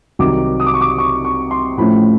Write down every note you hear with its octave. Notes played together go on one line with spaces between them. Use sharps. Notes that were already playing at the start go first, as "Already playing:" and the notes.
C2 C3 D#3 F#3 D6
D#6
D6
C#6
D6
C#6
C#6
C6
A2 F3 A3 C#4 E4 B5